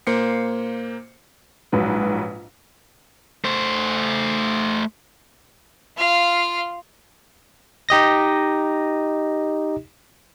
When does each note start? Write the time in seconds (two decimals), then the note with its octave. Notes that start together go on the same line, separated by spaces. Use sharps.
0.07 A#2 A#3 C5 C7 C#7
1.72 A#1 G#2 F#3 B4
3.45 A3 C5
5.97 F4 F5
7.89 D#4 G4 D#5 A#6